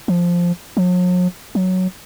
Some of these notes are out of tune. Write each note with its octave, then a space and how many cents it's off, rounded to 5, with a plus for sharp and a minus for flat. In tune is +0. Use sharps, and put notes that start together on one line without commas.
F3 +0
F#3 -45
F#3 +0